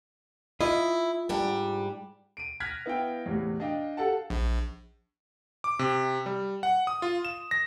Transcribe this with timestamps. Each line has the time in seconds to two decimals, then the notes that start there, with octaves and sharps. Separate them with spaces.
0.61 E4 F4 D#5
1.29 G#2 G3 D4
2.37 D7 D#7
2.60 F6 F#6 G#6 A#6 B6
2.86 B3 E4 F5 G5
3.26 E2 A2 C3
3.60 D4 D#5 F5 G5
3.97 G4 A4 F5 F#5 A5
4.30 A#1
5.64 D6
5.79 C3
6.26 G3
6.63 F#5
6.87 D#6
7.02 F4
7.25 E7
7.51 A#6